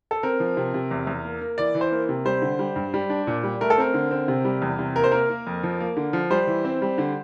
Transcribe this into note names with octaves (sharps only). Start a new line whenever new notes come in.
A4
C4 A#4
F3
C3
C3
E2
E2
A#3
A#3
E3 D5
E3
C5
A#3
C3
G3 C5
D3
G3
G2
G3
D4
A#2
G3
A3 A#4
A4
C4 A#4
D3
C4
C3
G3
E2
C3
A#3 A#4
C5
A#3 A#4
A#3
F2
F3
A#3
D3
F3
G3 C5
E3
C4
G3
D3